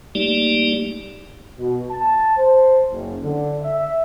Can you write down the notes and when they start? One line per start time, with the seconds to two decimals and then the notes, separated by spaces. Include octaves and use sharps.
0.15 G3 A3 A#3 D#4 G4 D5
1.58 B2
1.90 A5
2.37 C5
2.91 F#1
3.22 D3
3.62 E5